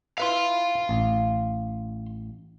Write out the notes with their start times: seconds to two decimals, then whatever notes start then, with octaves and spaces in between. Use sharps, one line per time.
0.18 E4 B4 E5 F5 C6
0.89 A1